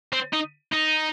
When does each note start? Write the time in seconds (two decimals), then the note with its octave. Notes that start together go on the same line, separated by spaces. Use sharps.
0.13 C4
0.34 D#4
0.73 D#4